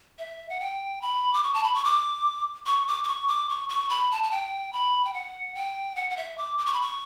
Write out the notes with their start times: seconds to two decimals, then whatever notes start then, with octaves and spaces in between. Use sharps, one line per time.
0.19 E5
0.49 F#5
0.60 G5
1.02 B5
1.34 D6
1.43 C#6
1.54 A5
1.64 B5
1.74 C#6
1.84 D6
2.66 C#6
2.88 D6
3.04 D6
3.08 C#6
3.28 D6
3.49 C#6
3.69 C#6
3.89 B5
4.11 A5
4.23 A5
4.31 G5
4.73 B5
5.05 G5
5.14 F#5
5.55 G5
5.96 F#5
6.10 F#5
6.17 E5
6.38 D6
6.58 D6
6.66 C#6
6.73 B5
6.81 C#6